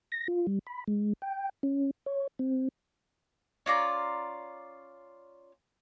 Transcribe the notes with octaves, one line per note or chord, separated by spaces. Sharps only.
A#6
F4
G3
B5
G#3
G5
C#4
C#5
C4
C#4 F4 D5 A#5